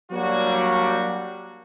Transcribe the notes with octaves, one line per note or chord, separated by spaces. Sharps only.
F#3 G3 A#3 D4 F#4